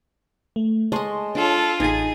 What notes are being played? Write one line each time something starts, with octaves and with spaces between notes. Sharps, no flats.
A3
G#3 C#5 D#5 A5 C6
D4 F4 A4
A1 D#4 G#4 G#5 G#6 A6